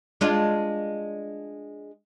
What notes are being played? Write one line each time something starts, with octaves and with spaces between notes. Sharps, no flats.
G#3 D4 F4